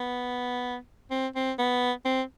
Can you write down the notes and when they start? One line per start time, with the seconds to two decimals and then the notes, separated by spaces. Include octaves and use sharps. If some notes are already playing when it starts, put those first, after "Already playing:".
Already playing: B3
1.11 C4
1.36 C4
1.59 B3
2.05 C4